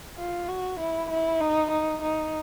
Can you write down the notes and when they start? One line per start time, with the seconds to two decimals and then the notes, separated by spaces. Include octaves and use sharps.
0.18 F4
0.48 F#4
0.79 E4
1.10 E4
1.40 D#4
1.70 D#4
2.02 D#4